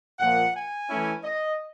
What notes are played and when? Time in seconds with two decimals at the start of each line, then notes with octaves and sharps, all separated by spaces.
0.19 A#2 F3 A#3 F#5
0.54 G#5
0.89 E3 A3 C#4 E4
1.23 D#5